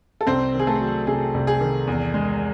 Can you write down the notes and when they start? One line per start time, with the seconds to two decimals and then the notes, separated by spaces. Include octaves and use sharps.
0.21 A4
0.27 C2 C4 C5
0.54 D#3
0.59 G#4
0.67 A3 A4
0.80 F#3
1.07 C3 G#4
1.34 C2
1.47 G#4
1.61 D#3
1.87 E2
2.14 G#3